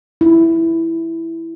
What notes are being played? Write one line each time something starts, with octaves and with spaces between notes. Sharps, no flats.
E4